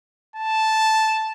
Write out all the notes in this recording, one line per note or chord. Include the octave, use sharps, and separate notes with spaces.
A5